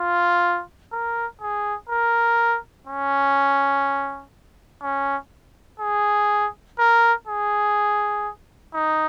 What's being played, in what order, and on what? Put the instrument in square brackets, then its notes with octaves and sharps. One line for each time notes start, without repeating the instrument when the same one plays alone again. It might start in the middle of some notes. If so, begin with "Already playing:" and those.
Already playing: [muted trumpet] F4
A#4
G#4
A#4
C#4
C#4
G#4
A#4
G#4
D#4